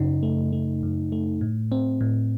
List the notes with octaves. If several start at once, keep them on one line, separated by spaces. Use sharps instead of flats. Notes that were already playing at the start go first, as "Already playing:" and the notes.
Already playing: F#2 C#3 D#4
A3
A3
F#2
A3
A2
C4
A2